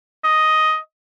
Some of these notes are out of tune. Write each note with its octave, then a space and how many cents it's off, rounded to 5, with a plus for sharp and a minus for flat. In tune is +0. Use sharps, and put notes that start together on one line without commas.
D#5 +5